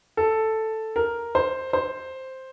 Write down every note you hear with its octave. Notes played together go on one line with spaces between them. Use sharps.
A4
A#4
C5
C5